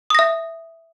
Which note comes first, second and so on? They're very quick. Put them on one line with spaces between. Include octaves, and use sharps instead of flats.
D#6 A#6 E5